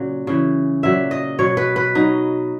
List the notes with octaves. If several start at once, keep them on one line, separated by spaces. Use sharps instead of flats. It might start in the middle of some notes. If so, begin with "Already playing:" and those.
Already playing: A#2 C#3 F#3
C#3 E3
A#2 F#3 E5
D#5
B2 F#3 C#5
B4
B4
B2 F#3 D#4